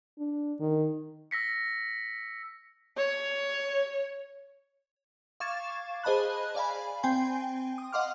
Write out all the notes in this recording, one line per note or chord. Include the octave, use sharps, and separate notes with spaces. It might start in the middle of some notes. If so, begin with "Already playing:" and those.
D4
D#3
E6 A#6 B6 C#7
C#5
F5 C#6 D6 G#6 A6 E7
G#4 C5 D#5 A5 B5 F#6
D5 F5 G#5 B5
C4 G5 G#5 C6
D#6
D#5 F5 F#5 C6 D6 F6